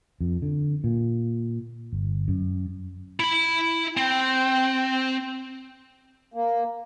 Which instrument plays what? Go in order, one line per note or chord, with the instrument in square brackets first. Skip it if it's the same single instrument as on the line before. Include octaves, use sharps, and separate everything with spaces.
[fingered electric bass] F2
D3
A#2
G1
F#2
[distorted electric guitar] E4 B5
[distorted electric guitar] C4 [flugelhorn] G5
[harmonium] A#3